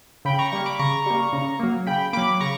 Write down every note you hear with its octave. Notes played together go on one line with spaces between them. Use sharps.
C#3 G5 B5
A#5 C#6
G3 A#3 A#5 C#6
B5 D6
C#3 A#5 C#6
G3 A#3
C#3
F#3 A#3
C#3 G5 B5
F#3 A#3 B5 D6
C#3 A#5 C#6